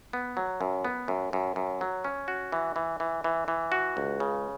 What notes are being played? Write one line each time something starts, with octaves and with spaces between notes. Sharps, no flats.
B3
F#3
F#2
B3
F#2
F#2
F#2
F#3
C#4
F#4
E3
E3
E3
E3
E3
F#4
C#2
C#3